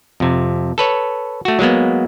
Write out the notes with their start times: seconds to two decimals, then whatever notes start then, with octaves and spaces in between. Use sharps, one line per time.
0.20 F2 C3
0.78 A4 B4 C#5
1.45 A3 F#4
1.59 F#3 G#3 A#3 B3